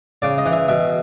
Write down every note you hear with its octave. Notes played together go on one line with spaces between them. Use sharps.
C#3 D5
D#5
E3
E5
B2 E5